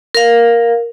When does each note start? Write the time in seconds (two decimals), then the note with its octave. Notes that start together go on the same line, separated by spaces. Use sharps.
0.15 A#4 F5